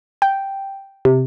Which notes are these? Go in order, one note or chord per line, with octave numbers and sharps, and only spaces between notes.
G5
C3